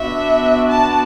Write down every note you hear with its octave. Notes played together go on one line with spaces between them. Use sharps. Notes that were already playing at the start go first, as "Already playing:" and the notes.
Already playing: B3 D4 F#4 E5
A5